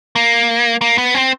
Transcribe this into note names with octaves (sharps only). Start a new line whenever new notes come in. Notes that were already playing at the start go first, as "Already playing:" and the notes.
A#3
A#3
B3
C4